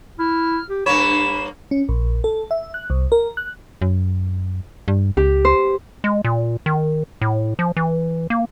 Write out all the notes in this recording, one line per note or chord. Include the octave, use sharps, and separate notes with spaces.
E4 F6
G4
G2 A#3 C#5 B5 E7
C#4
A#1
A4
E5
F#6
C2
A#4
F#6
F#2
G2
C#2 G4
C5
G#3
A#2
D#3
A2
F3
E3
A#3